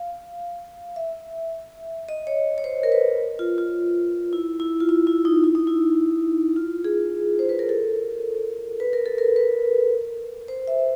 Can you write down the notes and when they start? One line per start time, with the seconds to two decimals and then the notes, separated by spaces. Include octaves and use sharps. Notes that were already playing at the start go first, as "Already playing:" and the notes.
Already playing: F5
0.96 E5
2.09 D#5
2.27 C#5
2.58 C#5
2.64 C5
2.83 A#4
2.92 B4
3.39 F4
3.58 F4
4.33 E4
4.60 E4
4.80 F4
4.89 E4
5.07 E4
5.25 D#4
5.44 E4
5.55 D#4
5.67 E4
6.56 F4
6.84 G#4
7.39 C5
7.49 B4
7.59 A#4
7.69 A4
8.80 B4
8.93 A#4
9.06 A4
9.18 A#4
9.36 B4
10.48 C5
10.68 E5